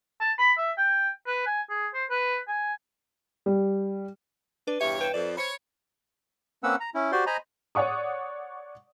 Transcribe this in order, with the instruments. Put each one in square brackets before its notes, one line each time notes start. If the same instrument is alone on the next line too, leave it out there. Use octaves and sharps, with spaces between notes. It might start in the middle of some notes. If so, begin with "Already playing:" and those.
[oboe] A5
B5
E5
G5
B4
G#5
G#4
C5
B4
G#5
[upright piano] G3
[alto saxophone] D4 [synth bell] B4
[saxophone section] E2 G2 C#5 [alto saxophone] G4 [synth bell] E5
[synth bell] B4 E7 [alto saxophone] G5
[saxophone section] F2 [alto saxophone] D5
[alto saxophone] C5 [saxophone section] C#5 [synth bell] B5
[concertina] A#3 C4 C#4 B4 F#5 E6
A#5
C#4 E4
F#4 G4 C5 D5 C6
C5 D#5 G#5 A#5 B5
[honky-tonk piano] C#5 D5 F#5 C#6 D#6